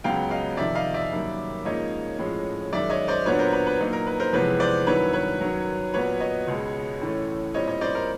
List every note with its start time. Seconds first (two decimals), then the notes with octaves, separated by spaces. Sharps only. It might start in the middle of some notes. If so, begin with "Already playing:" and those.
0.04 C#2 C#3 F#3 B3 F5 G5
0.31 D#5 F5
0.57 F2 C3 D#3 D5 E5
0.75 D#5 F5
0.94 D5 E5
1.12 F#2 D#3 G3 A#3 C#4
1.65 G#2 F3 A#3 C#4 C#5 D#5
2.18 A2 F3 G#3 C#4
2.73 F#2 D#3 G#3 D5 E5
2.90 C#5 D#5
3.08 C5 D5
3.26 A#2 F#3 B3 D4 B4 C#5
3.39 A#4 C5
3.53 B4
3.67 B4
3.80 A#2 F#3 A#3 D#4
3.93 A#4
4.07 B4
4.20 A#4 C5
4.33 F2 C3 E3 G#3 B3 B4 C#5
4.60 C5 D5
4.87 G2 D#3 F#3 B3 E4 B4 C#5
5.13 B4 C#5
5.41 F#2 D#3 F#3
5.94 A#2 F#3 B3 B4 C#5
6.20 C#5 D#5
6.47 C#2 B2 G#3
7.01 A2 E3 A3 C#4
7.54 A#2 G3 C4 E4 C#5 D#5
7.67 C#5 D#5
7.81 C5 D5
7.95 A#4 C5